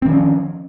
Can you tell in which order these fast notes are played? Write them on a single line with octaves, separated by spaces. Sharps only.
C4 D#3 C#4 F3